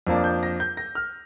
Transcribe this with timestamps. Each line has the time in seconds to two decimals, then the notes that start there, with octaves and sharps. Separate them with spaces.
0.07 F2 F3 A#3 D4
0.24 G6
0.43 A#6
0.60 G6
0.77 A#6
0.95 F6